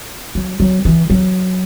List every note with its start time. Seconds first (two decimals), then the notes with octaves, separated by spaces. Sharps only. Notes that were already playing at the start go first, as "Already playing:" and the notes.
0.35 F#3
0.60 F#3
0.85 E3
1.10 F#3